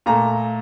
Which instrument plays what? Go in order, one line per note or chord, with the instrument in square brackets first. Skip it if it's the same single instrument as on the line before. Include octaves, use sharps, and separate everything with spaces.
[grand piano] A#2 A3 A#5